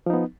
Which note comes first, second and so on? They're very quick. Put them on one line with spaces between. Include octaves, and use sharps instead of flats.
F3 D#4 B3